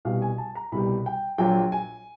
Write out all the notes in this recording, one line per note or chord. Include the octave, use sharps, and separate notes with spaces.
C2 B2 G3 F5
G#5
A5
A#5
C2 B2 G3 B5
G5
A#1 A#2 F#3 G5
G#5